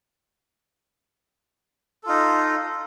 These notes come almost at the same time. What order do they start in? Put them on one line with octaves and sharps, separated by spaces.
A4 F4 D#4